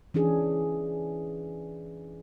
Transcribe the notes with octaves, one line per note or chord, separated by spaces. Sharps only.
E3 C#4 D4 G#4